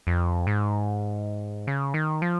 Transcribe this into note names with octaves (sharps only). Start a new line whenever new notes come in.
F2
G#2
C#3
D#3
F3